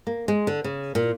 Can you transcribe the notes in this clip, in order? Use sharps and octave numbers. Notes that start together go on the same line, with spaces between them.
A#3
G#3
D3
C#3
A#2